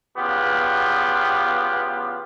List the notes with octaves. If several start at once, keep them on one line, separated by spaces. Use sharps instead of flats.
E2 C#3 B3 F4 G4